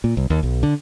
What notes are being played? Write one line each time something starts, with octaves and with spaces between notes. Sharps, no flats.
A#2
C2
D#2
B1
D3